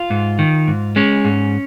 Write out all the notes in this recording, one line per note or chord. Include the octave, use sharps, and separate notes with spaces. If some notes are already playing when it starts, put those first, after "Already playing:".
Already playing: F4
G#2
D#3
G#2
G#3 C#4
G#2